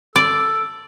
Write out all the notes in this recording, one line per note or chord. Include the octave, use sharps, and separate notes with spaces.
A4 D5